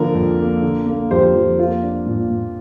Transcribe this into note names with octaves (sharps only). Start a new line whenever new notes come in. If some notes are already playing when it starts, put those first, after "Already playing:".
Already playing: D3 F3 A#3 A#4
F2
A#3
D3
A#3
F2 G4 C5
F2
A#3 F4
D4
A#2
A#2